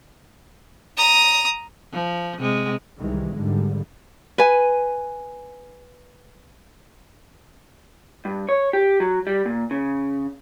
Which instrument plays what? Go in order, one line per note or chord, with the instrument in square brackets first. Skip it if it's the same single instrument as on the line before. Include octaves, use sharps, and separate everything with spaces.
[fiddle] A#5 D#6
[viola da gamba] F3
C3 G#3
[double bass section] C2 C3 D#3 E3 G3 G#3
G#1 G#2 D3 F3 G3
[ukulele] B4 G#5
[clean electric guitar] G2
C#5
G4
F#3
G3
A#2
C#3